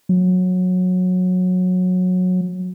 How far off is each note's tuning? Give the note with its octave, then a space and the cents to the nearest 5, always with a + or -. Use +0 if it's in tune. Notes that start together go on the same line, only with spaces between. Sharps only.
F#3 -20